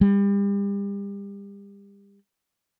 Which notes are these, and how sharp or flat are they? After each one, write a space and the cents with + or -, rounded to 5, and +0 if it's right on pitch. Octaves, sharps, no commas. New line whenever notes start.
G3 +35